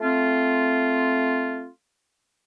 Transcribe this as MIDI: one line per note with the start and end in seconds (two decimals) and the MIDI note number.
0.01 1.68 57
0.01 1.68 60
0.01 1.68 65